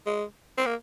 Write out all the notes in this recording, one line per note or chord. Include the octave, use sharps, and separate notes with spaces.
G#3
C4
A#3